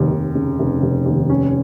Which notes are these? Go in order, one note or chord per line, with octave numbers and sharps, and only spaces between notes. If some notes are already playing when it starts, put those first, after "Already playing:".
Already playing: F1 D#2
F1
C#3
F1
F1
D#2
C#4